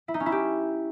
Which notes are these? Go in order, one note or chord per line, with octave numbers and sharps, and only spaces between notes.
E4
D#4
C#4
E4
G4